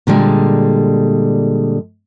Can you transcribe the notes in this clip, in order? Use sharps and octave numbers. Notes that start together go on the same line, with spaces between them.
A#2 D3 G3 G#3